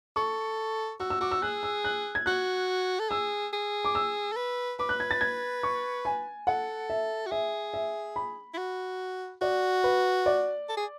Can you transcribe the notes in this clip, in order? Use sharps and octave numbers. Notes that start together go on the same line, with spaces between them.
A4 C#6
F#4 E6
E6
F#4 D6
E6
G#4 F#6
E6
F#6
G#6
F#4 F#6
A4
G#4 E6
G#4
D6
E6
A4
B4
B4 D6
F#6
G#6
A6
G#6
C#6
G#5
A4 F#5
E5
F#4
G#4 E5
E5
B5
E4
F#4
F#4 D5
B4
D5
A4
G#4